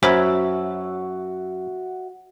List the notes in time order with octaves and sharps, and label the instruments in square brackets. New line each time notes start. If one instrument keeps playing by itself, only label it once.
[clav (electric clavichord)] F#2 [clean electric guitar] F#4 C#5 E5 [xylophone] C5 B5 G#6